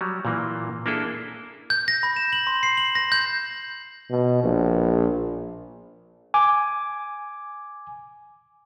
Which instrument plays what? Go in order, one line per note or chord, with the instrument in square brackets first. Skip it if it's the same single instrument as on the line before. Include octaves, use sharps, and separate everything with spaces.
[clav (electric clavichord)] F#3 G3
A#2 E3 A#3
A#3 D4 E4 G#4 A4
[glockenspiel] G6
A#6
B5
E7
F#7
C6
C7
F#7
A#6
G6
[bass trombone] B2
A#1
[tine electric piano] G#5 D6